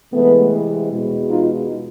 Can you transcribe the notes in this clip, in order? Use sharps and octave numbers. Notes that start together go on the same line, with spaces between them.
C3 E3 G#3 A3 B3
E2 B2 G#3
D#4 F4